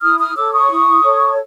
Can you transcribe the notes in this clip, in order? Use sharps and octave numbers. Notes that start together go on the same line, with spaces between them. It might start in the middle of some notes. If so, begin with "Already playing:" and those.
E4 D#6 F6
D#6 F6
A4 C#5 D6 E6
C#6 D#6
E4
A4 C#5